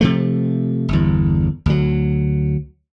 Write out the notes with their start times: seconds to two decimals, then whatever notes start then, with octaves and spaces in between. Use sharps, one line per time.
0.01 C3 F3 A3
0.89 G1 E2
1.66 D2 F#3